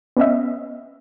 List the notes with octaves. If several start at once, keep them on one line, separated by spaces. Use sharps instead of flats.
B3 C#4 D#5 E5